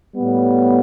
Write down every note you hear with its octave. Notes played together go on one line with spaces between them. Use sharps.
A2 G3 B3